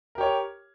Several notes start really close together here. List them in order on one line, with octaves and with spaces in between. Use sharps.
A#4 G4 C#5